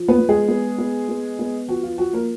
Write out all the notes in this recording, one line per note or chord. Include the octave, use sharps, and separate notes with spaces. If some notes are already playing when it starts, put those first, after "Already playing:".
Already playing: F3
B3 B4
B3
G#3 G#4
B3
B3
B3
B3
F3 F#4
F4
F3 F#4
A#3 A#4